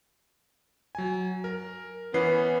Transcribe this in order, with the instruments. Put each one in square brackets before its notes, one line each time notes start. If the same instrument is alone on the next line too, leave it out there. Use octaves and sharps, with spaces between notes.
[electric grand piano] F#3 G#5
A#4
[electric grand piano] E3 C#4 C7 [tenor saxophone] B3